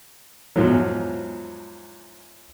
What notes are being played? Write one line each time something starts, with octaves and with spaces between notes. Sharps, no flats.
E2 G#2 F3 F#3